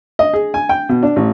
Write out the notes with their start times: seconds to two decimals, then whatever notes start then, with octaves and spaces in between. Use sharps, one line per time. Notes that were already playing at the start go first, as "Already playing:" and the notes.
0.19 D#5
0.33 G#4
0.54 G#5
0.69 G5
0.89 B2
1.03 D4
1.16 A1